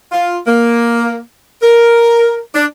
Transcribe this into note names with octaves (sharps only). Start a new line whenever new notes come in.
F4
A#3
A#4
D4